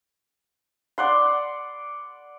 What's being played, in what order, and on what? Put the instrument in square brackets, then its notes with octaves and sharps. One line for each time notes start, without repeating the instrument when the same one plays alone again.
[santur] D5 F#5 C6